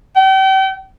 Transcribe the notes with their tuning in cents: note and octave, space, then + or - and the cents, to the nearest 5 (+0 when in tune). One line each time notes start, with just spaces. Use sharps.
G5 -40